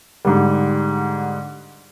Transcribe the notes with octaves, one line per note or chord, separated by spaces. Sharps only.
G#2 D3 G3